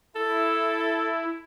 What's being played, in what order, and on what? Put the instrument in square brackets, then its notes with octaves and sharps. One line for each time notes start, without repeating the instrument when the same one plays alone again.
[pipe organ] E4 [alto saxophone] A4